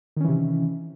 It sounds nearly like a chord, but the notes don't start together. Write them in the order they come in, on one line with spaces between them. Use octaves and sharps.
D#3 C#4 E3 C3